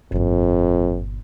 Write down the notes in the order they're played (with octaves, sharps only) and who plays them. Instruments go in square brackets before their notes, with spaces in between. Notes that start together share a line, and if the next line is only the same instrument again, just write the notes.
[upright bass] G1 A#2 [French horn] F2